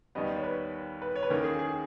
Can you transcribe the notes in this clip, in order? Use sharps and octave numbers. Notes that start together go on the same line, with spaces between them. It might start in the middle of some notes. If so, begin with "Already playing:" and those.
D#2 D#3 G3 B3 D#5
C#5
B4
B4
C#5
B4
D#2 D#3 A#3 C#4 A#4
G#4
G#4